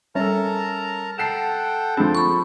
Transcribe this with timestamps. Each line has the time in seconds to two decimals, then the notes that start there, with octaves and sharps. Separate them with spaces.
0.15 G3 C#4 A4 A#4 A5 A#5
1.18 A4 F#5 G5 A5 C7 E7
1.97 F3 C4 D4 G#4 A4
2.15 B5 C#6